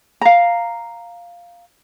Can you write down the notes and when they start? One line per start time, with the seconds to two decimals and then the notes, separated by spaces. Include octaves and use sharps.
0.21 F5 A#5